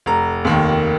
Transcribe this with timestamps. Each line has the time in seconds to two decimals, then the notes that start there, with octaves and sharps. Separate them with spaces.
0.06 F1 A#5
0.45 D#2 D#3 A#3